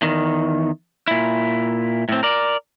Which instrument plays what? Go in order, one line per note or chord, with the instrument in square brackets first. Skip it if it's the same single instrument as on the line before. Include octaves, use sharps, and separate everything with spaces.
[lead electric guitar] E2 D#3
A#2 E4
A2 C4
A#4 D5